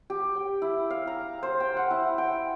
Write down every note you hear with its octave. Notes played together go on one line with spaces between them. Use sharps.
G4
G5
E4
F5
A#5
C5
G5
F#5
E4
G5